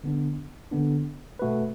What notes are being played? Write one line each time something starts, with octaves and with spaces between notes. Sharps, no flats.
D3 B3 D4
D3 B3 D4
B2 A3 F#4 B4